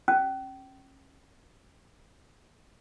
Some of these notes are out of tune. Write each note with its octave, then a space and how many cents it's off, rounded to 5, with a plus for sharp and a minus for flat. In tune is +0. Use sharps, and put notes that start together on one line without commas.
C#4 -30